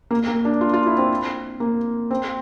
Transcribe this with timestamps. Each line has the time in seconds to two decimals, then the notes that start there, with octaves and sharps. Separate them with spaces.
0.11 A#3
0.28 A#3
0.45 D4
0.61 F4
0.73 F4
0.86 E4
0.98 C4
1.60 A#3
2.11 C4